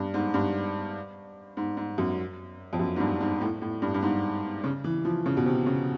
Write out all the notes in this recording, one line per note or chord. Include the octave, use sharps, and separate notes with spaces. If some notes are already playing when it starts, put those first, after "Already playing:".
Already playing: G2
G#2
G2
G#2
G#2
F#2
F2
F#2
G#2
G2
G#2
A2
A2
G2
G2
G#2
C#3
E3
F3
C#3
B2
C3
C#3